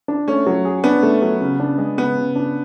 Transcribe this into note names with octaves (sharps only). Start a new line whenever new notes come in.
D4
A3 C#4
F#3
G#4
B3 D4
A3
F#3
C#3
D4
G#3
C#3 B3
C#3
D4